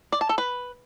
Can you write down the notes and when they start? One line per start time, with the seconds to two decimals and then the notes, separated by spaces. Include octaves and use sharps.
0.12 D5
0.21 A5
0.29 A4
0.38 B4